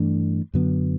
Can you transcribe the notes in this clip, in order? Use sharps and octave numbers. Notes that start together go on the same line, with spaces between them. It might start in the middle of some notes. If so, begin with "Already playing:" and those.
Already playing: G2 E3 A3 D4
F#2 D3 F#3 B3